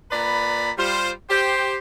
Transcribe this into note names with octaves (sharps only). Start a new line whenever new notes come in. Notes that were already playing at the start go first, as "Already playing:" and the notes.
A#2 B4 D5 A#5 B5
G3 F4 C5
G4 C5